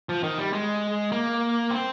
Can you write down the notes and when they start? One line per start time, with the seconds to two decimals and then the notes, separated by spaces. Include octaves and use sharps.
0.09 F3
0.23 D#3
0.38 G3
0.53 G#3
1.12 A#3
1.70 C4